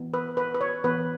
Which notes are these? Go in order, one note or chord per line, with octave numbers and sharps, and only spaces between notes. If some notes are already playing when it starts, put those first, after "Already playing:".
Already playing: E3 B3
B4
B4
B4
C#5
E3 B3 B4